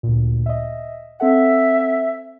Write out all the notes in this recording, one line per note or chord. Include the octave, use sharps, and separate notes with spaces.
D2 A#2
D#5 E5
C4 A4 E5 F#5